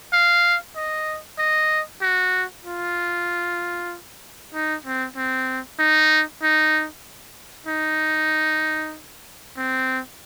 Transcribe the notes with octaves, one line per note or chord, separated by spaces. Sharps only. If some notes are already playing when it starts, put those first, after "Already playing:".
F5
D#5
D#5
F#4
F4
D#4
C4
C4
D#4
D#4
D#4
C4